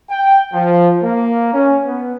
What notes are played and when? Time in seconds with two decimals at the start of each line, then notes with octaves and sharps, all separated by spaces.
0.10 G5
0.53 F3
1.03 A#3
1.54 C#4
1.85 B3